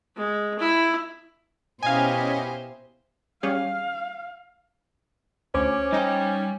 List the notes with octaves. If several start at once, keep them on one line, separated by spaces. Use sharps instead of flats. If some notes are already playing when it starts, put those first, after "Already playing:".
G#3
E4
B2 C#4 E4 G4 C5 D#5 F5 G#5
G3 C#4 G#4 F5
D2 C#4 C5 G#5 D6
G3 D#4 G5